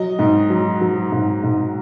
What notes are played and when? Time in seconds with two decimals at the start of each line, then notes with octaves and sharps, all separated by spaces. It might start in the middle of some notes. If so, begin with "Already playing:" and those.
Already playing: F#3 D#5
0.19 G#2
0.50 F#3
0.81 F#3
1.12 G#2
1.43 G#2